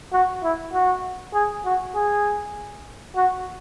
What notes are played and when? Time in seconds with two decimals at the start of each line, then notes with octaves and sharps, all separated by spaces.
0.13 F#4
0.43 E4
0.73 F#4
1.34 G#4
1.65 F#4
1.95 G#4
3.16 F#4